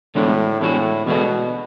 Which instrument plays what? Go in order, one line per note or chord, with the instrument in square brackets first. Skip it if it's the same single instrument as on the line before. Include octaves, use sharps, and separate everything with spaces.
[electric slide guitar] E2 D3 G#3 D4 F#4 [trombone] A2
[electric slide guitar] E2 D3 G#3 D4 F#4 [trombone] A2
[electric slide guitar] E2 D3 G#3 D4 F#4 [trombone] B2